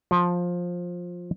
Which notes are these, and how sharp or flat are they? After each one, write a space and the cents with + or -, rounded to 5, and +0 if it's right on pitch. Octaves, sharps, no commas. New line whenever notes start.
F3 +15